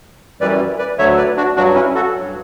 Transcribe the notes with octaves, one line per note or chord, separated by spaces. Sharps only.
F#2 E3 G3 B4 D5
B4 D5
D2 D3 F#3 C#5 E5
B4 D5
D4 F#4
G2 F#3 D4 F#4
C#4 E4
F#4 A4
G2 F#3